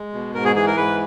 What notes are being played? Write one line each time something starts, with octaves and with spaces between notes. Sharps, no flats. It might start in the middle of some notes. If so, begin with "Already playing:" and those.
Already playing: G#3
B2
G#2 A#4
G#4
E3 G#4
A#4
G#2 B4